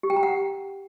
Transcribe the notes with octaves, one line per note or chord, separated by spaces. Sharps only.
G4
G5
A#5
F#5